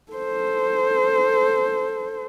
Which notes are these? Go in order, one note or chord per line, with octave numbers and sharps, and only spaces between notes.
A4 C5